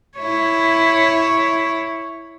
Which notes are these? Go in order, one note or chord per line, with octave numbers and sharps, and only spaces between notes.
E4 C#5